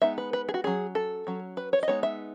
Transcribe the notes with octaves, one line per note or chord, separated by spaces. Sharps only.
G#3 B3 D#4 E5
B4
B4
G#4
F#4
F#3 C#4 G#4
A4
F#3 C#4
B4
C#5
D#5
G#3 B3 D#4 C#5
E5